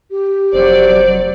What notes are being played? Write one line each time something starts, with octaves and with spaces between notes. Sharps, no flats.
G4
F1 F#3 C5 D5